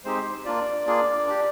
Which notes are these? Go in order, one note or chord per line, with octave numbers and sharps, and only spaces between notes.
G#3 C4 D#4 G4 C5
A#3 D4 F4 D5
A#3 D4 F4 G#4
D4 G4